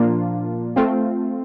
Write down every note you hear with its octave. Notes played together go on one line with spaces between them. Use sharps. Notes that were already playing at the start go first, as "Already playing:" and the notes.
Already playing: A#2 F3 A#3 D4 F4
A3 C4 F4